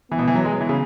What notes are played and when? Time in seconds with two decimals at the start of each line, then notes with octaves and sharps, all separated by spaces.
0.11 E3 B3
0.19 B2
0.28 E3
0.35 F#3
0.45 G#3
0.52 F#3
0.61 E3
0.69 C#3